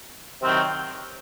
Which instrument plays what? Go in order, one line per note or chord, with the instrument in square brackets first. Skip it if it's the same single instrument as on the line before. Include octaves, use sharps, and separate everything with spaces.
[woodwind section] C3 D#3 F#3 C4